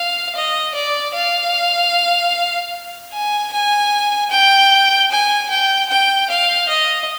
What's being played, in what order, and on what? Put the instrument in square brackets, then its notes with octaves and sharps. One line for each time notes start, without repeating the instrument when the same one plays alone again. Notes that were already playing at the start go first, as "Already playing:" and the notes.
Already playing: [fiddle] F5
D#5
D5
F5
G#5
G#5
G5
G#5
G5
G5
F5
D#5